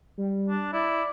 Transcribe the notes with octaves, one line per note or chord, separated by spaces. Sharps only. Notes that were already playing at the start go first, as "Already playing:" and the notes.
G3
D4
E4 D5